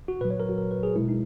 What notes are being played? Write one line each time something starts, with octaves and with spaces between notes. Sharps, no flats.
F#4
A#2 F#3 B4
C#5
A#4
F#4
A#4
B4
G#4
B2 G#3 E4
D#4